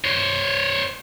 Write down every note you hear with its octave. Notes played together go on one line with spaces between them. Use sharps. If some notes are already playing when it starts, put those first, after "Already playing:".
C5 C#5